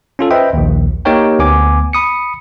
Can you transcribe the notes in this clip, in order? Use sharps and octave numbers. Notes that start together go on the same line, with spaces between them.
C#4 F4 A4
B4 C5 D#5 E5 G5
A#1 D#2
A#3 D#4 G4 A#4 C#5 G5
D2 B3 G#5 D6
B5 D#6 C#7